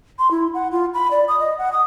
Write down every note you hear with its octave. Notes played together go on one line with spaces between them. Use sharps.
C6
E4
F#5
F4
B5
D5
D#6
D#5
F#5
D#6